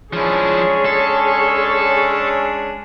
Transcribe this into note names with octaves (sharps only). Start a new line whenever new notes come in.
F3 G#3 C#4 D4 E4 G#4 C#5 C#6
A4